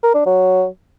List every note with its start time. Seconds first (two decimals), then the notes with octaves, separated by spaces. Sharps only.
0.03 A#4
0.14 D4
0.26 F#3